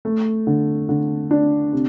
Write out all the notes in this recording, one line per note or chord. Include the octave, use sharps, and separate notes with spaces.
A3
D3
D3
D4
C3